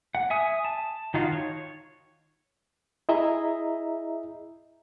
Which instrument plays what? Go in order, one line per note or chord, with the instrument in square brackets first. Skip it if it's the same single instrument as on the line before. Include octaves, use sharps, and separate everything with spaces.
[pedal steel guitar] F#5
E5 G#5 D#6
A5
D#3 D#4 F4 F#4
C#5
[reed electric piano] E4 G#4 D#5 E5 A#5